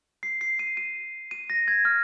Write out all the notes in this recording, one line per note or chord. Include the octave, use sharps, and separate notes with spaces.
C7
C7
D#7
D#7
D#7
A#6
G#6
F6